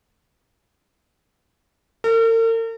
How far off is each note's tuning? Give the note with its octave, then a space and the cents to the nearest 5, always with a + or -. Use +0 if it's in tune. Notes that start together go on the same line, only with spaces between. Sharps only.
A#4 -45